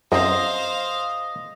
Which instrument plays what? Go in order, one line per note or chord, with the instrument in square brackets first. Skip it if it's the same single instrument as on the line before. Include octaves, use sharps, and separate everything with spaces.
[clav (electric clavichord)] F#2 C4 [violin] C5 F5 [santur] D#5